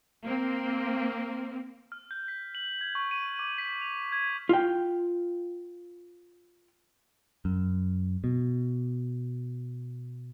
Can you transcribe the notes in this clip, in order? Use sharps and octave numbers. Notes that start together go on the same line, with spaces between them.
A#3 C4
F6
G6
B6
F#7
G#6
C#6
D#7
D6
B6
F7
G#6
F4 G5
F#2
B2